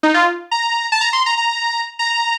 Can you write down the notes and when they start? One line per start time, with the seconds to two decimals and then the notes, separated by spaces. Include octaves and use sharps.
0.03 D#4
0.14 F4
0.51 A#5
0.92 A5
1.01 A#5
1.13 C6
1.26 A#5
1.38 A#5
1.99 A#5